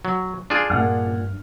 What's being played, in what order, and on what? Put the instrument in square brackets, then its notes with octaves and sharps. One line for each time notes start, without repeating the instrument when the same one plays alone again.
[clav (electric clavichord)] F#3
D4 F4 G#4
[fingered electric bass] G2 [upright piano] A#2 F#5 F6